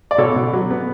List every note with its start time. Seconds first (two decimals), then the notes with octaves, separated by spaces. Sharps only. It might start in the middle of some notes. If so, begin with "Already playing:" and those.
0.11 D5
0.18 B2 A4 C#5
0.36 B2
0.53 F#3
0.71 B3